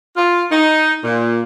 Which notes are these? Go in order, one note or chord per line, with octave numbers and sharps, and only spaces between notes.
F4
D#4
A#2